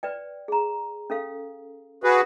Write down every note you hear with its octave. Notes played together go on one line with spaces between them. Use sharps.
B4 D5 G5
G#4 A#5
C#4 A4 F5
F#4 G#4 B4